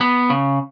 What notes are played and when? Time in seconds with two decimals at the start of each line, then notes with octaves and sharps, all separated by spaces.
0.01 B3
0.30 C#3